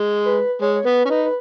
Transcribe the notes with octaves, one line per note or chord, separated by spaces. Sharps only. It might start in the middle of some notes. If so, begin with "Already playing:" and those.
Already playing: G#3
B4
G#3 C#5
C#5
B3 B4
C#4
D#4 B4
B4